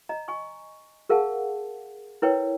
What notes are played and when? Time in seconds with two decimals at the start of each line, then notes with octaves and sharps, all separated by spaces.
0.09 D#5 A#5
0.28 G#5 C#6
1.09 G#4 A#4 F5 F#5 A5
2.22 E4 A#4 B4 C#5 G5